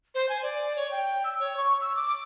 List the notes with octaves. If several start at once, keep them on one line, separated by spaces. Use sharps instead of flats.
C5
G#5
D5
C#5
G5
E6
C#5
C#6
E6
D6